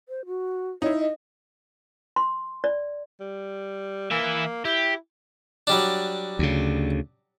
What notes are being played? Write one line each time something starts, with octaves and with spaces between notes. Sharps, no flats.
C5
F#4
D#4 E4 C#5
D#5
C6
D5
G3
E3 A#3 E5
E4 G4
F#3 G3 D4
D2 C#3